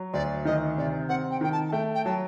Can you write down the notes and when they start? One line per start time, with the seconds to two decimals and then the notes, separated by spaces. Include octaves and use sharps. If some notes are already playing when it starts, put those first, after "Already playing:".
Already playing: F#3
0.13 D2 D5
0.45 D#3 D#5
0.78 C3 D5
1.09 C4 F#5
1.31 G5
1.41 D#3 G5
1.52 A5
1.69 A5
1.72 A3 G5
1.95 G5
2.05 F#3 A5